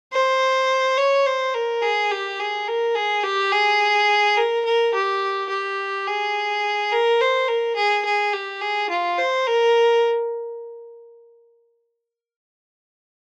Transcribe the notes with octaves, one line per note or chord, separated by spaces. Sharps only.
C5
C#5
C5
A#4
G#4
G4
G#4
A#4
G#4
G4
G#4
A#4
A#4
G4
G4
G#4
A#4
C5
A#4
G#4
G#4
G4
G#4
F4
C5
A#4